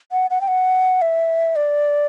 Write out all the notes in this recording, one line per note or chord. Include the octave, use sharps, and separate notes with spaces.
F#5
F#5
G5
F#5
E5
D5